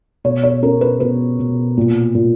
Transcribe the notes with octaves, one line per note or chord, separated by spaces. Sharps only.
B2 C#5
C#5
C#4 A#4
B4
B2 B4
B2
A#2
A#2